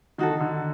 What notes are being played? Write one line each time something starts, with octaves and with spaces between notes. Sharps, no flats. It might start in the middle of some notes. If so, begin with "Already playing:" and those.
D#3 D#4 F#4 A4
D#3
D3